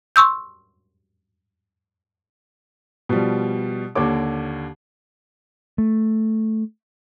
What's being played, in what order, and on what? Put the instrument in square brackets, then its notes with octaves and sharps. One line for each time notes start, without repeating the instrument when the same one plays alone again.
[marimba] C6 C#6 E6 G6
[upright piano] B2 F3 G3
D#2 D3 C#5 D6
[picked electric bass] A3